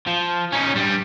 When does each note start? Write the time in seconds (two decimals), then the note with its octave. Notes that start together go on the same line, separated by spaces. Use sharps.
0.07 F3
0.52 C#4 D#4
0.76 G2 G3